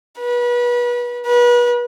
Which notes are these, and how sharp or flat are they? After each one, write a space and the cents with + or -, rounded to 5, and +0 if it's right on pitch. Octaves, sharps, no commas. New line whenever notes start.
B4 -30
B4 -35